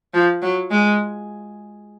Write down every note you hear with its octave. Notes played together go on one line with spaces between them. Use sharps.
F3
F#3
G#3